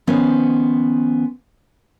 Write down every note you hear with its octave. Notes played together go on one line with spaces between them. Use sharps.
D#3 F3 B3 C#4 C5